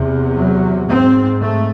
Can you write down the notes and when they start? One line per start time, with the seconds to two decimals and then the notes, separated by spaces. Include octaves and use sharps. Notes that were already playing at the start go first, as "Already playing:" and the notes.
Already playing: E2 C3
0.36 F#3
0.89 G#2 C4
1.42 A3